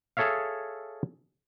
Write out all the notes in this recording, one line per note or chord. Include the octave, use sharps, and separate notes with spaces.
G#4 A4 C#5 E5 F5